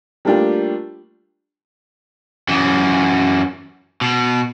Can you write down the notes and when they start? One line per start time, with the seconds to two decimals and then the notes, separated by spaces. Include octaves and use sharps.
0.25 G3 A3 A#3 D4 F4 G4
2.48 F#2 E3
4.01 B2